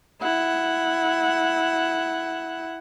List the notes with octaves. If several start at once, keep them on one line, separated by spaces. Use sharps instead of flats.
E4 F#5